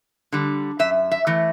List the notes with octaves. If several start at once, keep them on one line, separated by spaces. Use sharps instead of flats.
D3 G3
F#2 E5
E5
E3 A3